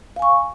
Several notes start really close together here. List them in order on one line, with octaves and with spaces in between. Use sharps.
F5 G#5 C#6